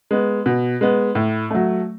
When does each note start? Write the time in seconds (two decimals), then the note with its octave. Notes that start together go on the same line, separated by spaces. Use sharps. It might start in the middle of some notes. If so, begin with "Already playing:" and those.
0.11 G#3 B3
0.46 B2
0.81 G#3 B3
1.15 A2
1.51 F#3 A3